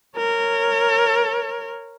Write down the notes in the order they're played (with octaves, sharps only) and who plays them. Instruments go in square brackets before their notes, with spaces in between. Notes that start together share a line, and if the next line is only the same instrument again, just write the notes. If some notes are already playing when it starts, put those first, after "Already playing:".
[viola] A#4 C#5